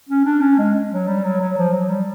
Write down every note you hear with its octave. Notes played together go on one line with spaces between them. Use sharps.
C#4
D4
C#4
G#3
F#3
G3
F#3
F#3
F3
F#3
G3